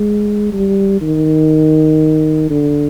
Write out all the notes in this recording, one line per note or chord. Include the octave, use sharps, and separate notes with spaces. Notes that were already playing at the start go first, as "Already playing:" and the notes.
Already playing: G#3
G3
D#3
D3